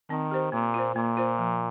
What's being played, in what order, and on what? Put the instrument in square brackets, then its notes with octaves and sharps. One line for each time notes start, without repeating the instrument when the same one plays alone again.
[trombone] D#3 [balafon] C4
[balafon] G4 C5
[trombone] A#2 [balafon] A#3
[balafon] F4 C5
[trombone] A#2 [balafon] A#3
[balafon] F4 C5
F3